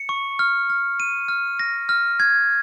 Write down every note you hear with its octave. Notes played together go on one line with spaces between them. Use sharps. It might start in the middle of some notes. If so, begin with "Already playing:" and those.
Already playing: C#7
C#6
F6
F6
D#7
F6
A#6
F6
G#6